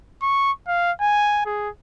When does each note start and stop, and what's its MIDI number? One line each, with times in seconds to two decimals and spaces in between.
0.22 0.52 85
0.67 0.91 77
1.00 1.42 80
1.45 1.69 68